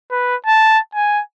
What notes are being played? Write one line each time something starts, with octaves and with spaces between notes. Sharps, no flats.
B4
A5
G#5